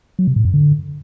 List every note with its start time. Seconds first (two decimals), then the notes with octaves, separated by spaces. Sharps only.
0.19 F#3
0.27 C3
0.36 A2
0.45 F#2
0.54 D3